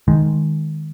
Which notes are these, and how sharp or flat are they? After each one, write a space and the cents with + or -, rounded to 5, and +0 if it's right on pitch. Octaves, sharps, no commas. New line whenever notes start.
D#3 +0 G#3 +0